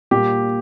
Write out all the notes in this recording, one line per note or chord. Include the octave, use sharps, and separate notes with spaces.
A#2 G3 A#3 G4